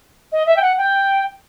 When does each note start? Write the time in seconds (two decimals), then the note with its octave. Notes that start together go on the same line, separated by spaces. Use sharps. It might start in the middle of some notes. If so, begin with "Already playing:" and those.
0.32 D#5
0.46 E5
0.56 G5
0.62 F#5
0.78 G5